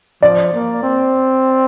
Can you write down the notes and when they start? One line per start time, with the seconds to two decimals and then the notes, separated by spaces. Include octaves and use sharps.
0.23 F3 D5
0.54 A#3
0.83 C4